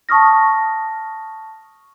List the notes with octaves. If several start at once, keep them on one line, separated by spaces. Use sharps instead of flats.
A5 C#6 D#6 F6 A#6